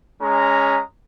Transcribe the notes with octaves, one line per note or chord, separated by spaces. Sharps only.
G#3 C#4 A#5